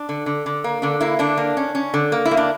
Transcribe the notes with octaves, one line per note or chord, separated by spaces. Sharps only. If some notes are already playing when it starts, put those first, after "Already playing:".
Already playing: D4
D3
D3
D3
A#3
D3 D4
A#3 E4
D3 D4
A#3
C#4
C#4
D3
A#3
E4
A#3
D4